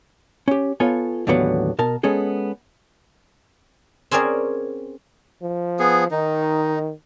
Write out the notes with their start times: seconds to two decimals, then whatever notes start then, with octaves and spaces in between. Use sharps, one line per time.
0.48 C#4 G4
0.80 B3 F4 A4 C#5 G#5
1.27 D#2 A2 D3 E3 F#3 B3
1.79 B2 A#4 A5
2.03 G#3 B3 C#4 G#4 A4
4.11 C4 C#4 G#4 A#4 D5
5.42 F3
5.79 B3 G#4
6.11 D#3 D#4